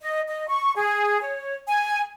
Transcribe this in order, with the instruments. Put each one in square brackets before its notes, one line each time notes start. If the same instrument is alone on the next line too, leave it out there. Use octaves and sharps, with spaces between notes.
[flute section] D#5
D#5
C#6
G#4
C#5
G#5